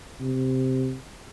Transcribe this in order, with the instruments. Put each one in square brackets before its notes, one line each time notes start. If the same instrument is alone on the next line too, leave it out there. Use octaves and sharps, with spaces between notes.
[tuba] C3